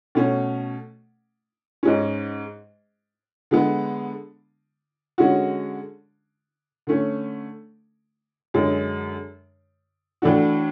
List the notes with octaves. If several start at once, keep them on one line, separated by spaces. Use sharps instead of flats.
B2 A3 C#4
G#2 G#3 C#4
D3 G#3 B3
D3 G#3 C#4 F#4
D3 A3 C#4
F#2 D3 G#3
A2 E3 A3 D4 F#4